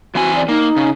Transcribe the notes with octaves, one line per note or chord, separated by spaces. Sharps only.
E3 C4 F#4 G#5
D5
A#3 D#4
C#3